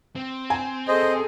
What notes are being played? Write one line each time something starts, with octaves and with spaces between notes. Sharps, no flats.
C4
G#5
G#4 A4 C5 D#5